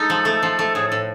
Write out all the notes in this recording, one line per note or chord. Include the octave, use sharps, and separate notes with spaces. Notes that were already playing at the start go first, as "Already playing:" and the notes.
Already playing: G#3 D#4 A4
F3
A3
F3
A3
A2 G#4
A2 A4